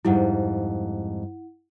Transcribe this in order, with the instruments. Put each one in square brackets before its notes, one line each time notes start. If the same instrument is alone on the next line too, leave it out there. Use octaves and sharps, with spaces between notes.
[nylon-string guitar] F2 G#2 G3 [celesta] E4 F#5